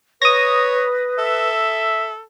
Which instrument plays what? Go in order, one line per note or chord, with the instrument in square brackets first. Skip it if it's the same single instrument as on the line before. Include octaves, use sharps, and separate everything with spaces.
[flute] B4 [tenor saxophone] C#5 [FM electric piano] D#6 A#6
[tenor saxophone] A4 [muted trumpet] E5